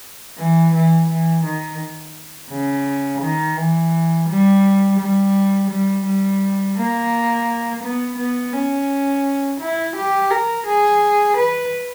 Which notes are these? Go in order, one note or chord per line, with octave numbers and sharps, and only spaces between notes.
E3
E3
E3
D#3
C#3
D#3
E3
G3
G3
G3
G3
A#3
B3
B3
C#4
E4
G4
A#4
G#4
B4